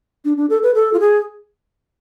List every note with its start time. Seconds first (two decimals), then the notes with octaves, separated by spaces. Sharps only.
0.25 D4
0.37 D4
0.50 A4
0.63 B4
0.75 A4
0.94 F4
1.00 G#4